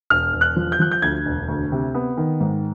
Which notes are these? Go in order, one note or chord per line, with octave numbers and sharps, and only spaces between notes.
E1 F6
E1
F#6
F3
G6
F3 F#6
G6
D2 G#6
E1
D2
C3
B3
D#3
G#2